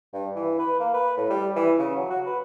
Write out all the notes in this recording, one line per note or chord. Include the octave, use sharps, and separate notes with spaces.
G2
E3
B4
A#3
B4
A2
G3
E3
C#3
F#3
F#4
B4